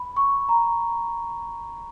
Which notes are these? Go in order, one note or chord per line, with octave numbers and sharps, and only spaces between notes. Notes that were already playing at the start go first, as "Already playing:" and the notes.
Already playing: B5
C#6
A#5